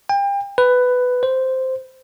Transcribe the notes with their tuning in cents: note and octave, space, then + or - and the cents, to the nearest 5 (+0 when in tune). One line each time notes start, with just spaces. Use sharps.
G5 +35
B4 +10
C5 -5